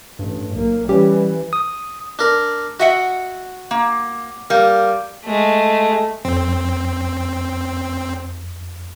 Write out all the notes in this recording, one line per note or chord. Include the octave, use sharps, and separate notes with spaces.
A1 G2
B1 A#3
E3 G3 C#4 G4
D#6
D4 A#4
F#4 D#5 E5 F#5
A#3
G3 A#3
G#3 A3
F2 C4